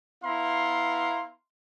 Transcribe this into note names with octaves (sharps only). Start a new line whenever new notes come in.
B3 E4 F5 A#5 C6